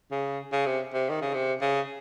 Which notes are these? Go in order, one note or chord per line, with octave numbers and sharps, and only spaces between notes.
C#3
C#3
C3
C3
D#3
C#3
C3
C#3